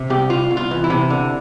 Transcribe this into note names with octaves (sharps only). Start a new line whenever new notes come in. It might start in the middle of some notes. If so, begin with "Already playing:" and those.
Already playing: C3
C2 G4
C2 F4
C2
F4
E3
E4
C3
D3